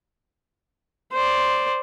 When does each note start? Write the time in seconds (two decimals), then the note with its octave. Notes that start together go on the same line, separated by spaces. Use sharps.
1.13 C5 D5